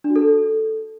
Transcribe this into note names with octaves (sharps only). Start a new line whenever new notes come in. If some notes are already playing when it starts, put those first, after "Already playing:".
D4
F#4
A4